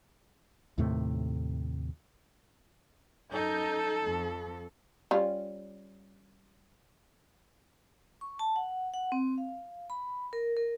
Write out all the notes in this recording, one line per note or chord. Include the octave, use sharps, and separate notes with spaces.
D#2 A2 C3 A3
F#2 D#4 A4 G6
F2
G3 C#4 F4
C#6
A5
F#5
F#5
C4
F5
B5
A#4
A#4